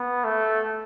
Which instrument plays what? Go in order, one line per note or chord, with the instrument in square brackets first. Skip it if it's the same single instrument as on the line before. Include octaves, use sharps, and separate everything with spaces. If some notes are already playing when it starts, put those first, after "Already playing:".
Already playing: [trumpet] B3
A3